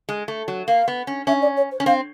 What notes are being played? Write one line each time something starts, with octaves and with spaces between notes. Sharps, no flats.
G#3
A3
F#3
A#3 F5
B3
C#4
C#4 E5
D5
C#5
C5
C#4
C4 F5